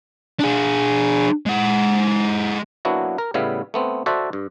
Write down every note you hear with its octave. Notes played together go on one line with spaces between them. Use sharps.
D4 G#4
G#3 F#5
F#3 A#3 B3 D4 E4 F#4
A#4
A2 C#3 G3 B3 E5 F5
A3 B3 C4
F#4 A4 C5 D5 E5 F#5
G2